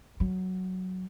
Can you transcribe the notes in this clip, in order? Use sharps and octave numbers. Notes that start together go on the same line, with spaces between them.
F#3